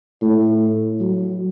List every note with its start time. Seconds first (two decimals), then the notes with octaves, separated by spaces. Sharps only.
0.22 A2
1.00 F#3